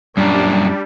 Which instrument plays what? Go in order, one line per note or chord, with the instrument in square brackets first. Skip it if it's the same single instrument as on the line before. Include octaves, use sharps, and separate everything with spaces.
[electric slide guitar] F#2 A#2 [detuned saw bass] G3 [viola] D4